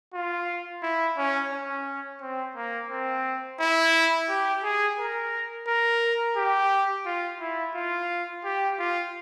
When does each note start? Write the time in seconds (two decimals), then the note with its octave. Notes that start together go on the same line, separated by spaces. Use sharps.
0.14 F4
0.82 E4
1.17 C#4
1.52 C#4
2.21 C4
2.56 A#3
2.90 C4
3.60 E4
4.29 G4
4.63 G#4
4.98 A#4
5.67 A#4
6.36 G4
7.06 F4
7.40 E4
7.75 F4
8.44 G4
8.79 F4